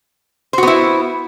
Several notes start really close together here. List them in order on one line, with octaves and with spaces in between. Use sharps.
C5 F#4 B3 E4